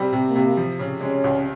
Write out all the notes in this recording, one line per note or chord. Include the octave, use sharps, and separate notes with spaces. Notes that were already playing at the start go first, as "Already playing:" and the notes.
Already playing: C3 G3 C4
C3
A#3
C3
F3
C#3
G#3 C#4
C#2